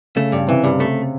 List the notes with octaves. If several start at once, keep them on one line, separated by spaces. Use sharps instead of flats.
C#3 A3
G2
C3 E3
G2
A3